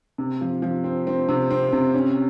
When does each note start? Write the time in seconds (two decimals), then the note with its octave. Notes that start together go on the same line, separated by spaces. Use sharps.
0.18 C3
0.41 F3
0.62 F3
0.84 C4
1.07 C4
1.29 C3
1.50 C4
1.73 C3
1.94 C#4